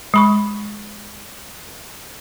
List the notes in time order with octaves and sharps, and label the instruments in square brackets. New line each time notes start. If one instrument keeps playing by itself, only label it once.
[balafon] G#3 B5 C#6